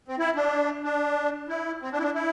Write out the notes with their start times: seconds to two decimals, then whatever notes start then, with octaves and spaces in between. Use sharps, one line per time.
0.08 C4
0.19 E4
0.35 D4
0.84 D4
1.49 E4
1.82 C4
1.92 D4
1.99 E4
2.03 D4
2.14 E4